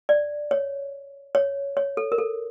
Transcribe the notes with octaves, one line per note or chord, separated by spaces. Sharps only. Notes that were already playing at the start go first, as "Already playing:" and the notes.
D5
C#5
C#5
C#5
A4
A#4
A4